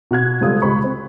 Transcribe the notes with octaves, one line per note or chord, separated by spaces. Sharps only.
B2 F#4 F#6 G#6
F#1 G3 G#3 F4 A4 D#6
C#2 G#3 G4 C5 B5 C#6
C4